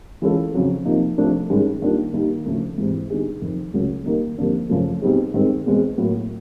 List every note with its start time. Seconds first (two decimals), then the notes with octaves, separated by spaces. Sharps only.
0.22 E3 G#3 C#4 F4 A4
0.54 F2 C#3 F#3
0.85 C3 F3 A#3 D#4
1.18 C3 F3 A3 D4
1.50 G2 D#3 G#3 C#4
1.82 D#3 G3 A#3 D4 F4
2.13 D#2 D#3 G3 A#3 D#4
2.46 D2 C#3 F3 A3
2.78 G#2 E3 G3 C4
3.10 D3 G3 B3 D#4 G#4
3.41 F2 C3 D#3
3.74 C#2 C#3 F#3 A3 C#4
4.06 D#3 G3 A#3 D#4
4.38 F2 D3 G3 A#3 D4
4.69 F#2 C#3 F3 A3
5.02 B2 G3 C4 D#4 G#4
5.34 G2 D#3 G#3 C4
5.66 E2 B2 G#3 C4
5.98 A2 F#3 A#3